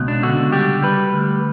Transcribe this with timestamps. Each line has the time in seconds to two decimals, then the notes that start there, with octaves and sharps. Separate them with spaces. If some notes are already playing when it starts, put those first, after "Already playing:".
Already playing: C#2 B2
0.08 D4
0.23 D3 F#4
0.52 G3 G4
0.83 G3 B4
1.13 D2